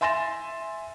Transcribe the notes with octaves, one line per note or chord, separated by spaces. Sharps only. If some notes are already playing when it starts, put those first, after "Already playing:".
E5 G#5 C6 A6 A#6 E7